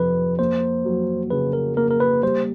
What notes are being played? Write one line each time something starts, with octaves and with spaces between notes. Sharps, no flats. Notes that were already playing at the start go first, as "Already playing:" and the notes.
Already playing: F2 C3 F3 B4
A#3 C5
F#3
C#3 B4
A#4
A#3 A#4
A#4
B4
G3 C5